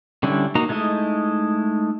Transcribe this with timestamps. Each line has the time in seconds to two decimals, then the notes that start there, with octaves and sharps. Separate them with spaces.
0.23 D3 G3 C#4 D4 E4
0.55 A#3 D#4 F#4 A#5
0.69 G#3 A3 D#4 E4 D#5